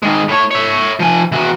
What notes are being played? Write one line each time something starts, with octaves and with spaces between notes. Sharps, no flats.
D#3 G#3
A2 C#5
C#5 E5
F3 G#5
E3 F#4